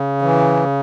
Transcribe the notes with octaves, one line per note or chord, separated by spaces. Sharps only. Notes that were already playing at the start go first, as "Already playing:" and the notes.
Already playing: C#3
E3